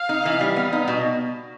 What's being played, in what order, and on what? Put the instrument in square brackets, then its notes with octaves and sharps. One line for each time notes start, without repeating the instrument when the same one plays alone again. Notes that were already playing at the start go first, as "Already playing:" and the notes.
Already playing: [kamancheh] F5
[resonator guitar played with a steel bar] D#4
E3
G3
B3
D#4
B2